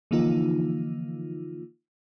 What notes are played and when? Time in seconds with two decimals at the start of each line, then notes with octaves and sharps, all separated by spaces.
0.11 D3 E3 F3 A#3 D#4 F4